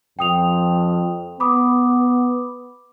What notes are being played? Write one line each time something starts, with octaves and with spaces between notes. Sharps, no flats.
F2 G5 D#6 F7
B3 B5 D6 D#6